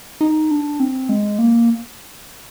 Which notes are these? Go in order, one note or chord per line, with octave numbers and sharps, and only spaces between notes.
D#4
D4
C4
G#3
A#3